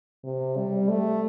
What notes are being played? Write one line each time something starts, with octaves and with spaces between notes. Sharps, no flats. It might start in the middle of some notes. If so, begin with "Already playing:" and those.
C3
G3
A3